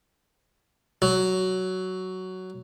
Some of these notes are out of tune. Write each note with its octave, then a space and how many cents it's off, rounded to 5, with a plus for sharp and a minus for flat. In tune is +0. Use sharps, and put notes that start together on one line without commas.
F#3 +10